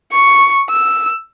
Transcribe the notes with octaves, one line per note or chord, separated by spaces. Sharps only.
C#6
E6